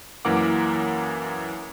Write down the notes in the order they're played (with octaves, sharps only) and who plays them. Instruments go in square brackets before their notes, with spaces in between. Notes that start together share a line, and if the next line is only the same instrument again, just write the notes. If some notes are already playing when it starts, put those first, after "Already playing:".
[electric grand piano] F#2 E3 A#3 A#4 F#5 D6